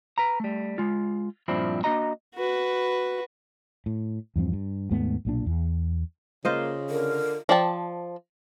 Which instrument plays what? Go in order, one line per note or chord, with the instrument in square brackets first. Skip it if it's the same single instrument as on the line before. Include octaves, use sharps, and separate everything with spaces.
[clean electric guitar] B4 A#5
G3 A3
G#3 F4
G2 A#2 F3 C4 D4 E4
A#3 D4 F#4 D#5 A#5
[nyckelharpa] F#4 B4
[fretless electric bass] A2
E2 G2 F3 C4
G2
D#2 G#2 A3 B3
B1 A#2 D4
E2
[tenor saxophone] C#3 [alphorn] A#3 [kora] F4 C5 D#5
[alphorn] D3 [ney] A#4
[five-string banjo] F3 D5 G5 A5